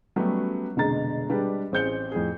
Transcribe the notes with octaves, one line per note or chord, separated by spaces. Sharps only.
F#3 G3 A3 B3 C#4 G4
F1 B2 D3 G#3 A#5 A6
G3 G#3 D4 G4 B4
A1 C4 G#4 G6 C#7 G7
F2 A2 G#4